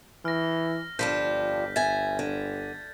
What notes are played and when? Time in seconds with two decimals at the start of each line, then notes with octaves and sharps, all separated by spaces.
0.25 E3 F6 A#6
0.99 G1 F3 G3 D4 G6 B6
1.76 E5 G#5 G#6 A6
2.19 D3